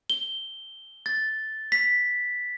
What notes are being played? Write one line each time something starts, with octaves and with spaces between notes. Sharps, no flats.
G7
A6
B6